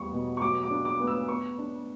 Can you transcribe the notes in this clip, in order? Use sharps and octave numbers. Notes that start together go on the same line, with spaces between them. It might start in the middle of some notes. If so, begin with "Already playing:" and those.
Already playing: E2 G3 C#6
B2
C#6
F#3 D6
D6
D4
D6
B3
E6
B3 C#6
D4